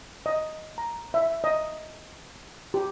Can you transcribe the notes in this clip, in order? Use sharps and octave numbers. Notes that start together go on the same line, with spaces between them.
D#5
A#5
E5
D#5
G4